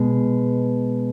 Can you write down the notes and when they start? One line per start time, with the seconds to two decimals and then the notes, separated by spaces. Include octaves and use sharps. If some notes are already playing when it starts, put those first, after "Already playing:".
Already playing: B2 G#3